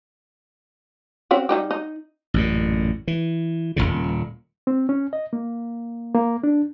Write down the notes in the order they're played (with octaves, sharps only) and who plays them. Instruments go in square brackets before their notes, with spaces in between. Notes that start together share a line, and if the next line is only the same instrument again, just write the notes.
[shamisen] C4 C#4 F#4
G3 D#4 G4
D#4
[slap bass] A1 F#2 A#2
E3
D#1 G#1 A#2 C#3
[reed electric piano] C4
C#4
D#5
A#3
A#3
D4